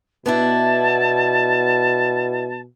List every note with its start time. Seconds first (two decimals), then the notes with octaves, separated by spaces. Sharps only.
0.26 B2 B3 D4 E4 A5